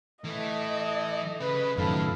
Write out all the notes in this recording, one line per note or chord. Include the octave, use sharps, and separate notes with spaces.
A2 E3 A3 D#5
C#3 B4
F#2 A2 D#3 F3 A4 F5 B5